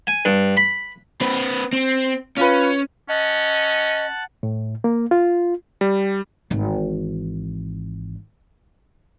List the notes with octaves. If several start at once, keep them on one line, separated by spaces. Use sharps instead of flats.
G#5
G2
B5
C4 B4
C4
C#4 F4 B4
C#4 D#5 F#5 A5
A2
A#3
F4
G3
G#1 E3